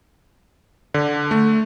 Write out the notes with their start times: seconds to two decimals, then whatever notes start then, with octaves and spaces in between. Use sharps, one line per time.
0.94 D3
1.31 A3